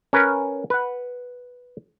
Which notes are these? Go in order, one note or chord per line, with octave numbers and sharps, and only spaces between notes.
C#4 A#4 B4
B4 F#5